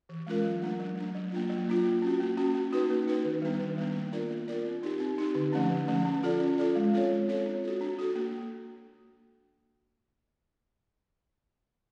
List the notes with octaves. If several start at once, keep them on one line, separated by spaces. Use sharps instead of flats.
E3
G#3 C#4 F4 A#4
F#3
A3 D4
F#3
A3 D4
F#3
A#3 D4 F4
F#3
A#3 D4 F4
A#3
C#4 F#4
A#3
C#4 F#4
A#3
D#4 F#4 B4
A#3
D#4 F#4 B4
D#3
G3 B3 D4
D#3
G3 B3 D4
A#3
D4 F4 A#4 D5
A#3
D4 F4 A#4 D5
C4
D#4 G4
C4
D#4 G4
D3
F3 A3 C#4
D3
F3 A3 C#4
C#4
F4 A4 D5
C#4
F4 A4 D5
G#3
C4 F4 A4 C#5
G#3
C4 F4 A4 C#5
D4
F#4 A4
D4
F#4 A4
A#3